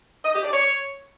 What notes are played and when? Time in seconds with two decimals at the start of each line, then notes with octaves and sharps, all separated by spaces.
0.25 D#5
0.34 G4
0.43 D5
0.52 C#5